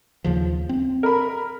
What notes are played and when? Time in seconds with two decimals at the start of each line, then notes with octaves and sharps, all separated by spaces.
0.24 D#2 C#3 F3
0.69 C4
1.03 A#4 B5